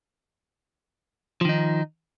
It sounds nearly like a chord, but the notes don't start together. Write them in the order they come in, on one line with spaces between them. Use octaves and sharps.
F3 D#3 D#4